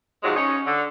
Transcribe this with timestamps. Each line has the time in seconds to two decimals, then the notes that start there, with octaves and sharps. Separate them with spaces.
0.23 G#2 C3 F3 F#3 G#3
0.36 C#4 D#4 C#5
0.66 D3